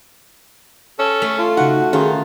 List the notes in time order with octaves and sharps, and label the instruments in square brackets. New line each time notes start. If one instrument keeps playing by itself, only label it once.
[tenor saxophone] C#4 [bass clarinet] A4
[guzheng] A3
[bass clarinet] F4
[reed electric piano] C#3 D#4 [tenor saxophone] F#4 [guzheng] F#5
[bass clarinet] D#3 [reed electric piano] C#4 G#4 [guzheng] F4